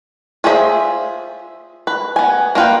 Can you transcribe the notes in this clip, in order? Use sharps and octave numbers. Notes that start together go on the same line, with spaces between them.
F4 G#4 C5 D#5 E5
B4
B3 G#5
A#3 D4 F4 B4 G5